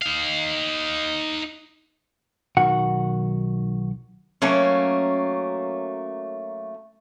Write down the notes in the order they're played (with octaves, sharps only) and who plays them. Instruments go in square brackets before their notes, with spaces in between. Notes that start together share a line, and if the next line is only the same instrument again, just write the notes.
[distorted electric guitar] D#4 F5
[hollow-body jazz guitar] B1 D#3 F#4 F#5
[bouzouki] F#3 A3 A#3 C#4